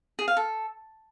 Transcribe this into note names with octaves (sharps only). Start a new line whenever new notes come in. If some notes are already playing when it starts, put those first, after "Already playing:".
G#4
F5
A4